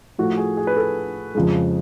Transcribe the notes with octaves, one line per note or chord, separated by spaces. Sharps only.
A2 F3 A3 F#4
G#4
G#4
B4
A4
F2 C#3 F3 G#3